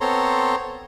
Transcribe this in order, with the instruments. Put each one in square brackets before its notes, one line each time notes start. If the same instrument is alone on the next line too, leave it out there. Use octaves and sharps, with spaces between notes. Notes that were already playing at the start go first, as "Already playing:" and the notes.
[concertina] B3 C4 A4 C#5 A#5 C6